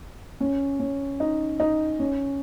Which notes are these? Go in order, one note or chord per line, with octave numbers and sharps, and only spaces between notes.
C#4
C#4
D#4
D#4
C#4